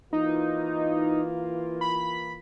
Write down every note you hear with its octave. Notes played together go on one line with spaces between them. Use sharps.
E3 A#3 D#4 F4
B5